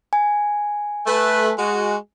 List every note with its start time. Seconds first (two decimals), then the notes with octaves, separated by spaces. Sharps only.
0.13 G#5
1.06 A3 B4
1.59 G#3 F#4